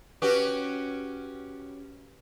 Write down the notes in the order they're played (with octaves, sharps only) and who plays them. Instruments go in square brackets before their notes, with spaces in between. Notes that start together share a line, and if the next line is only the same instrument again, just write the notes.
[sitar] C#4 F#4 G4 [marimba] B4